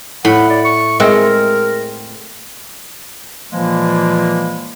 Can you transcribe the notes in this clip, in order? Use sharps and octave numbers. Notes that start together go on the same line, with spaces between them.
A2 F#5 B5
D5
C#6
G#3 C4 A#4
A#2 E3 F3 G#3 A#3